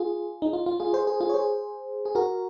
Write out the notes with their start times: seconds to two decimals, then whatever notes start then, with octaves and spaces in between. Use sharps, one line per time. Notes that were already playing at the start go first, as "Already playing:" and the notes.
Already playing: F4 G#4
0.42 D#4
0.53 F4
0.66 F4
0.80 F4 G#4
0.93 G#4 C5
1.07 G#4 C5
1.21 F4 G#4
1.29 C#5
1.34 G#4 C5
2.05 G#4
2.15 F#4 A#4